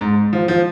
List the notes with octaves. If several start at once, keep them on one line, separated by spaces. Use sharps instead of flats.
G#2
F3
F3